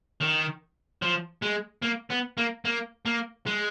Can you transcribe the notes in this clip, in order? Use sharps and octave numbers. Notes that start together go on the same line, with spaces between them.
D#3
F3
G#3
A#3
B3
A#3
A#3
A#3
G#3